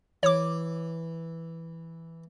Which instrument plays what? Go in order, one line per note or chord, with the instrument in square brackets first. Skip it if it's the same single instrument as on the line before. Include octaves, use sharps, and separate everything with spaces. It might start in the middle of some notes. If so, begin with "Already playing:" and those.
[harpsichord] E3 [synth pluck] C#5 D6